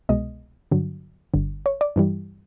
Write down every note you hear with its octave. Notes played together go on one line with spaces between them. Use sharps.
C2 B2 G#3 D#5
G2 D3 F#3
G1 G2 D3
C#5
D5
G2 E3 G3